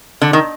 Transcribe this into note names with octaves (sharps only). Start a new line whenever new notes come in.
D3
D#3